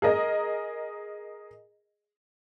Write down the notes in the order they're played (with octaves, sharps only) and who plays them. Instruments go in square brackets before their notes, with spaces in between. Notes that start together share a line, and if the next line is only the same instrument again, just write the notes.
[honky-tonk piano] G#4 A#4 D#5